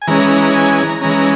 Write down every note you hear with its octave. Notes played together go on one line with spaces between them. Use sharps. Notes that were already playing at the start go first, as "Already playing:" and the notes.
G#5
E3 G#3 C#4 A#5
A#5
G#5
A#5
E3 G#3 C#4 A#5